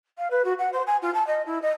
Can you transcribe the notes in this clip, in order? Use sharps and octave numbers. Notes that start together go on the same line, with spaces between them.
F5
B4
F#4
F#5
C5
G#5
F4
A5
D#5
E4
D#5